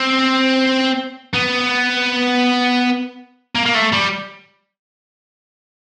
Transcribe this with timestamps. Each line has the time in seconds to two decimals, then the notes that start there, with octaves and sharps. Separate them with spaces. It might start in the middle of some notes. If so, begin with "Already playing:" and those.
Already playing: C4
1.34 B3
3.55 A#3
3.65 A#3
3.74 A3
3.92 G3